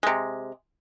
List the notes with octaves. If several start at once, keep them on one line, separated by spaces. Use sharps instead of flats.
C3 G#3